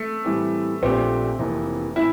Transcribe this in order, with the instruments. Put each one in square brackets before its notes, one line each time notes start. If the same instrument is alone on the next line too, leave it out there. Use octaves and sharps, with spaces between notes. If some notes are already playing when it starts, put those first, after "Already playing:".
Already playing: [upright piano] A3
[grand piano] A2 E3 G3 C4 G4
[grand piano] A#1 A#2 A3 D4 G4 [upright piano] C4
[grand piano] F1 F2 E3 A#3
[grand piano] A2 E3 [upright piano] E4